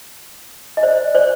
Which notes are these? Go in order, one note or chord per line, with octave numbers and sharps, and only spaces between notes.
D#5
C5 D5
C5 D5